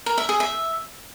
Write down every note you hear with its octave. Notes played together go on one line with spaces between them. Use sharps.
A#4
E5
G#4
E5